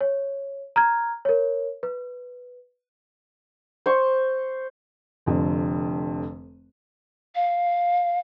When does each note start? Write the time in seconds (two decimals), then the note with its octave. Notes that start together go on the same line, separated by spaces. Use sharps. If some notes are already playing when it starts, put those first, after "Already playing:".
0.01 C#5
0.76 A#5 F6 G#6
1.25 A#4 C#5
1.83 B4
3.86 C5 C#6
5.26 F1 F2 D3
7.35 F5